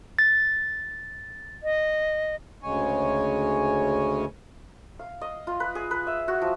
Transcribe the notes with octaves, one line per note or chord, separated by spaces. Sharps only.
A6
D#5
D2 C#3 G#3 C#5 G#5
F5
D#5
F4
B4
G#4
B4
E5
F#4
F3